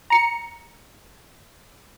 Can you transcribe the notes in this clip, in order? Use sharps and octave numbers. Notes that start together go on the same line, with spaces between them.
A#5 C#7